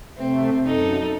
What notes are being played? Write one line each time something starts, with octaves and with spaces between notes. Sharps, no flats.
C3 A3 C4
F#2 D#4 A4